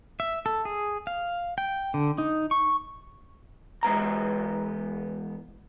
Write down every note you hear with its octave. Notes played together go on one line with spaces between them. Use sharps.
E5
A4
G#4
F5
G5
D3
D#4
C#6
E2 G#3 B3 A#5